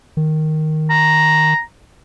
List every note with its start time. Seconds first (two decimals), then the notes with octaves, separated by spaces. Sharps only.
0.17 D#3
0.90 A#5